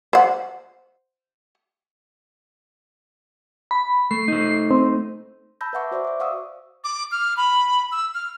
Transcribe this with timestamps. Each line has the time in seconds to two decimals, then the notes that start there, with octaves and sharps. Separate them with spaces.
0.13 C5 F#5
3.71 B5
4.11 A3 C7
4.28 A3 D#4
4.71 C4
5.61 A5 B5 E6 G6 A#6
5.73 B4 E5 F#5 C#6 D6
5.91 F#4 C5 D5 E5
6.05 E5 D6
6.20 D5 F5 F#5 C#6 D#6 E6
6.84 D6
7.12 F6
7.37 B5
7.92 E6
8.14 F6